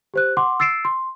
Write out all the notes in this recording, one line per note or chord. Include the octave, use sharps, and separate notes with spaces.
G4 C5 F#6
F#5 C6 D6
E6 A6 C7 D7 E7
C6